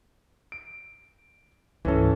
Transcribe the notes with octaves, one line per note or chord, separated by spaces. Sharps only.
D7
C#2 G#2 E3 C#4 A4